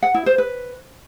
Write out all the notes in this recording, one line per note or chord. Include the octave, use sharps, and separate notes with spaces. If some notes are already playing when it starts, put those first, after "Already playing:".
F#5
E4
C5
B4